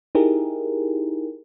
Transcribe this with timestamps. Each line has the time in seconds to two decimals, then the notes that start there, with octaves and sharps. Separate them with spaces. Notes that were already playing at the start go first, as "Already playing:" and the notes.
0.15 D#4 E4 G4 G#4 A#4